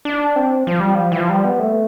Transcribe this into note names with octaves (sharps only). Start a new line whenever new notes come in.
D4
C4
F3
G3
F3
E3
F3
G3
B3
A3